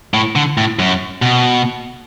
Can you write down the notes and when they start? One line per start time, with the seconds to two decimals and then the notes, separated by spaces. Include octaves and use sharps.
0.14 A2
0.36 D3
0.58 A2
0.79 F#2
1.22 B2